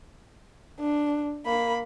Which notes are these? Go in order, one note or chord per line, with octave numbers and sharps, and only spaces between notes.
D4
A#3 B5